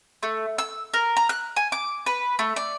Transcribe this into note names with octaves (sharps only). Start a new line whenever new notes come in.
A3
E6
A#4
A#5
F#6
G#5
D6
B4
A3
D5